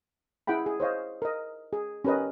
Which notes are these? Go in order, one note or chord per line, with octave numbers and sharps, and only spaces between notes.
E4 G#4 F#5 G5 B5
G#4
C5 C#5 D#5 F5
A#4 D#5
G#4
C#4 G4 A#4 B4 D#5